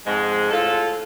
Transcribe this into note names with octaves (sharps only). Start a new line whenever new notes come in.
F2 G#2 G#3
A2 F4 A4